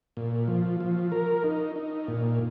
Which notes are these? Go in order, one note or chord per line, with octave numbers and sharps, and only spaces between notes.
A#2
F3
F3
A#4
D#4
D#4
A#2